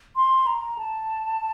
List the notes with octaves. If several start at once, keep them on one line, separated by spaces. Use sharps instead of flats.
C6
A#5
A5